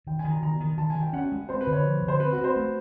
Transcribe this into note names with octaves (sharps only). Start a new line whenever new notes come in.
D#3 G5
G#5
D#3
A#5
D#3 A#5
D#3
D#3 A5
G#5
D#3
G5
C#4 F#5
G#3
C4 C5
B4
D3
C#5
F3
D3
C5
C4 B4
F#4
C4
C5
A3